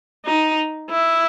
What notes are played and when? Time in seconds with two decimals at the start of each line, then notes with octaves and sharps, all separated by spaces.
0.26 D#4
0.90 E4